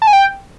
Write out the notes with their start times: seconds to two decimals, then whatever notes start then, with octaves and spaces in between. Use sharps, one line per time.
0.02 A5
0.07 G#5
0.13 G5